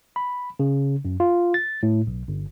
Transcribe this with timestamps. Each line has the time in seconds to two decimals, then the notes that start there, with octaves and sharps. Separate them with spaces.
0.16 B5
0.60 C#3
1.05 F#2
1.20 F4
1.54 A6
1.83 A2
2.07 B1
2.28 G1